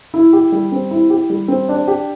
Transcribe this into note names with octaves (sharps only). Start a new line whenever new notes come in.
E4
G4
G3
C4
E4
G4
G3
C4
D4
G4